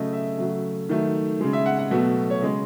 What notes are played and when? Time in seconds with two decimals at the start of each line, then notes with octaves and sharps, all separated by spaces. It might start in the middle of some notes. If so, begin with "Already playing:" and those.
Already playing: C#3 F#3 A3 D#5
0.13 E5
0.39 C#3 F#3 A3
0.89 D#3 F#3 A3
1.41 C#3 G#3
1.53 E5
1.66 F#5
1.79 F#5
1.91 B2 F#3 A3 E5
2.30 C#5
2.42 C#3 G#3 D#5